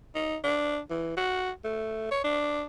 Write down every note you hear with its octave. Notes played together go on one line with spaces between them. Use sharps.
D#4
D4
E3
F#4
A3
C#5
D4